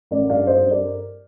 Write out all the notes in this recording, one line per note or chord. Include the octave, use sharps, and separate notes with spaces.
A1 A#4 D5
G2 D5 F5
G2 C5 D#5
G2
A#4 D5